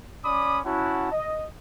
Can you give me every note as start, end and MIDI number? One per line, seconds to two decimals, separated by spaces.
0.24 0.59 61
0.24 0.59 74
0.24 0.59 83
0.24 0.59 86
0.24 0.59 87
0.66 1.11 61
0.66 1.11 64
0.66 1.11 66
0.66 1.11 78
0.66 1.11 81
1.11 1.44 75